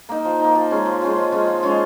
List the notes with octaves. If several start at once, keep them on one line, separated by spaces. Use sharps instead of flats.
A#3 D#4
F3
A#3 D#4
F3
G#3 C#4 F4
F3
G#3 C#4 F4
F3
G#3 C#4 F4
F3
G#3 C#4 F4